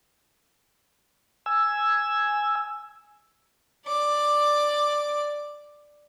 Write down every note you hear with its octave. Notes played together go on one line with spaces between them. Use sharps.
G#5 E6
D5 D6